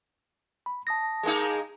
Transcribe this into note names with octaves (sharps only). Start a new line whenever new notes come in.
B5
A5 D#6 A#6
G#3 A#3 D#4